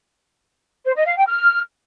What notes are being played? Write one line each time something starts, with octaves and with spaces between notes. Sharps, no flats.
C5
D#5
F5
G5
F6